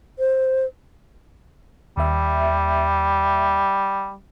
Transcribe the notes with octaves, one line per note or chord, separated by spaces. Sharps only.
C5
D#2 G3 E5